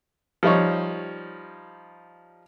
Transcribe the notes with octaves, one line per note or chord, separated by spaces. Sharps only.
F3 G3 D#4 C#5